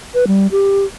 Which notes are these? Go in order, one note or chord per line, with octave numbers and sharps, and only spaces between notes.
B4
G3
G4